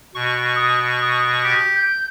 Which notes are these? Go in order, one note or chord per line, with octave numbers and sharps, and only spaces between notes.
B2 C#6
D#6
D#6
G4
G6